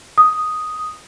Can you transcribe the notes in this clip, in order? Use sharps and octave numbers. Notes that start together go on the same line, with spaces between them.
D#6